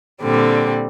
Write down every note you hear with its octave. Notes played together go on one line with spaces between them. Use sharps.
A#2 D3 G3 C4